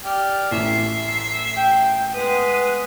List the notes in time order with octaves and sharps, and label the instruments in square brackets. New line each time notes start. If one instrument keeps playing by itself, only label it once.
[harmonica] G4 D5 F6
[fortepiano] A1 [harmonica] E5 [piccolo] C7
[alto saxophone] G5 [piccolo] G6
[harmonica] G#3 F#5 [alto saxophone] B3 [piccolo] D#7